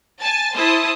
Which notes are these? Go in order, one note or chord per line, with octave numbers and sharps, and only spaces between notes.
G#5 A5 A6
E4 C5 A5 D#6